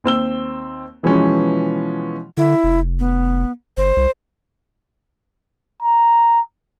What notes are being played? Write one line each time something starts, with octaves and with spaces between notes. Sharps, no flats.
D#2 C4 E6 G7
B2 E3 F3 G#3 B3 C#4
D3 E4
F1
B3
G1 C5
C2
A#5